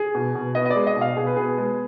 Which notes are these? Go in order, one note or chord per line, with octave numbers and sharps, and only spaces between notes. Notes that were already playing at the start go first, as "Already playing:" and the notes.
Already playing: G#4
B2
B2
B3 D#5
D#5
D5
G#3
D#5
B2
F5
B2 G#4
B4
B3 G#4
G#3